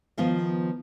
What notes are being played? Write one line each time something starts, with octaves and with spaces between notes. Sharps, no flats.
D#3 F3 B3 F4